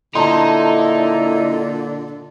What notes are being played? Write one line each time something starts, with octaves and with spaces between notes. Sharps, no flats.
A#2 D3 D#4 E4 A5 A#5 C6